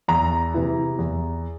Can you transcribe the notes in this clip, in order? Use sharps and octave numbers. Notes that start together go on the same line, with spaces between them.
E2 A#5
C3 E3
E2